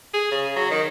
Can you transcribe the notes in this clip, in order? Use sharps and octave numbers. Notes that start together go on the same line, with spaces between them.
G#4
C#3
F#3
D#3